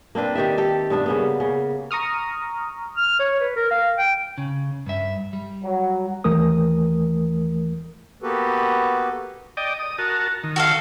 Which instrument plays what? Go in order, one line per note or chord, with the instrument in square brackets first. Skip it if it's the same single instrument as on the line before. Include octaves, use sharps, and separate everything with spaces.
[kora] A#3 C4 D4 B4
D#3 G4 D5 E5
G4 A4
G2 B3 D4 E5
C#3 A#3 B3
C#3
[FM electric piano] A#5 C#6 D#6 F6
[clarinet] F6
C#5
B4
A#4
F5
G5
[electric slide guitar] C#3
G2 E5
G3
[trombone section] F#3
[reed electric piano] D#2 E3 A3 A#4 D#6
[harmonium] A#3 B3 F#4 G4 A4 B4
[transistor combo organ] D5 D#5 G5
D#6
F#4 A#4 A5
D#3
[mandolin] F#4 A4 F5